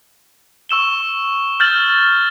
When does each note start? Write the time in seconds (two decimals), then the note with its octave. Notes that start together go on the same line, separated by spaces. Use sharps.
0.69 C#6 E6 E7 G7
1.60 F6 G6 A6 F#7